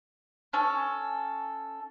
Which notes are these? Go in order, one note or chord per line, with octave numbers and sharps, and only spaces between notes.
C#4 A4